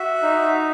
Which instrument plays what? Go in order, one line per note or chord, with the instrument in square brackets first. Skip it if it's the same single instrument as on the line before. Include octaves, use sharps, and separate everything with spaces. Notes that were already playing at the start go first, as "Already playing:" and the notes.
Already playing: [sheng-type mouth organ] F#4 E5
D#4